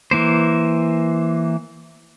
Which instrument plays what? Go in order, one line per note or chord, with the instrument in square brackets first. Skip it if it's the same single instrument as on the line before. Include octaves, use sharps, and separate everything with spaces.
[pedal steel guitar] E3 A#3 C5